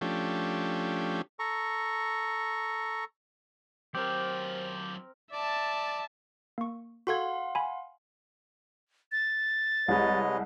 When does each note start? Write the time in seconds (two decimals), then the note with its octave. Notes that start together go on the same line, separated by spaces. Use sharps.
0.01 F3 A3 C#4 D4 G4
1.39 A4 A#5 C#6
3.95 F#3 C4 G4 A#4 C5
5.32 D5 E5 A5
6.58 A#3 C#6
7.07 F#4 A4 F5 F#5 C6 G#6
7.55 G#5 B5
9.12 A6
9.88 C2 G#3 B4 C#5 D#5